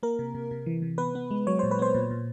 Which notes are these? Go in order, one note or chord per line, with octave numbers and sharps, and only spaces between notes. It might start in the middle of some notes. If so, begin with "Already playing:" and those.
A#3 A#4
C3
C3
C3
E3
C3
B3 B4
B3
G#3
F#3 C#5
A#2 C5
B4
B3 C5
A#2
A#2